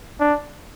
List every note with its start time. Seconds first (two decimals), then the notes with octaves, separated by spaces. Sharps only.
0.20 D4